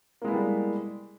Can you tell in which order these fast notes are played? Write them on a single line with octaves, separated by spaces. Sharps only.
A#3 G#3 E4 B3 G3